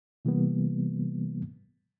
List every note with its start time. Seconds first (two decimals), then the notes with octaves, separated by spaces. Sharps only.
0.25 C3 E3 G3 A#3 B3